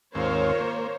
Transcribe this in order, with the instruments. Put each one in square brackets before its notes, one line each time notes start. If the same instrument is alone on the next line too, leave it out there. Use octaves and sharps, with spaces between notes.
[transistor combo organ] D#2 G#2 C4 [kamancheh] F4 A#4 [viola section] C5 C#5
[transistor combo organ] A#3